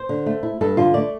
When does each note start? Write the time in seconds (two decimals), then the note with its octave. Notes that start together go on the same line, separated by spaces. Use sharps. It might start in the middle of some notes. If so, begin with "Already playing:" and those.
Already playing: C5
0.09 D3
0.26 A3
0.43 E4
0.61 G2 A4
0.77 D3 F4
0.94 A3 D5